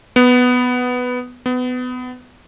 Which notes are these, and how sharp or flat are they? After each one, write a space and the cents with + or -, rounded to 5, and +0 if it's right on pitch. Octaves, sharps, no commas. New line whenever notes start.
B3 +5
B3 +25